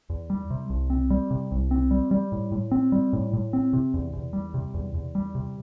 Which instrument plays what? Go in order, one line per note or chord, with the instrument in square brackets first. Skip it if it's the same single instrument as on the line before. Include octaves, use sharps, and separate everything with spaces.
[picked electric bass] E2
G3
C3
C2
C4
G3
C3
C2
C4
G3
G3
A2
A2
C4
G3
A2
A2
C4
C3
E2
E2
G3
C3
E2
E2
G3
C3